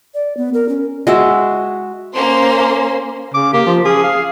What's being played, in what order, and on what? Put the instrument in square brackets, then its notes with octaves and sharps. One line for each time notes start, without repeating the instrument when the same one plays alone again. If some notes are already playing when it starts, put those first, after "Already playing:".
[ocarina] D5
B3
A#4
C#4
[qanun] G#3 F#4 E5
[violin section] A#3 C#4 C5 C6
[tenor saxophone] C#3 [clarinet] D6
[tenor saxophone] A#3 [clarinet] G4
[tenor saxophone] F3
[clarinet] C#4 [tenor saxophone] G#4
[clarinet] F5